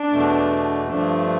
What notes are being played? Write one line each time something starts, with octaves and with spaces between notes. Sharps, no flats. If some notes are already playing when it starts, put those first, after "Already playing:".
Already playing: D4
E2 B2 A3
G2 F3 A3 D4